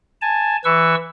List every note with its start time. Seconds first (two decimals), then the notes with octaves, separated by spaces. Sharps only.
0.22 G#5 A5
0.65 E3 B4 C#6 E6